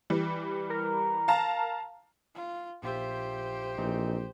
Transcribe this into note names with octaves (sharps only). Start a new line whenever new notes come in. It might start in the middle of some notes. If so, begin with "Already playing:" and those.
E3 G3
A#4
F5 A5 A#5
F4
A#1 F4 G4 C5 E5
A#1 E3 C4 D#4